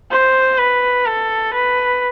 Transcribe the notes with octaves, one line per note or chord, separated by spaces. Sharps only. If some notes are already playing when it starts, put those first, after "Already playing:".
C5
B4
A4
B4